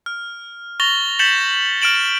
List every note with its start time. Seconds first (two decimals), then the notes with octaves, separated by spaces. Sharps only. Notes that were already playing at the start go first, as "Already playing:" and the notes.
0.06 F6
0.80 C#6 A6 A#6 F7 G7
1.19 G6 A6 B6 C#7 E7 F#7
1.81 F6 C#7 D7 E7 F#7